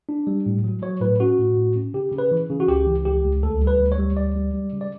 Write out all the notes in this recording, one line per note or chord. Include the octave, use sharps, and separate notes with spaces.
D4
G3
A2
F#3
F#3 C#5
A2 B4
C#4 F#4
A2
A2
C#4
C#3 G4
C#3
B4
E3
C#3
F#4
C#2 G4
E3
C#2 G4
C#2
D2 A4
G3
B4
D2
C#5
G3
D2 D5
G3
G3
C#3
D5